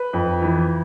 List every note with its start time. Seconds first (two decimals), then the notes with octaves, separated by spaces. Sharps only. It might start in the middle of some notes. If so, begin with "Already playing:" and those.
Already playing: B4
0.13 F2
0.42 E3